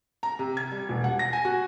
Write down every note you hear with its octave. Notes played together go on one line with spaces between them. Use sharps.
A#5
C3
G#6
G3
E1
F#5
A#6
G#5
F#4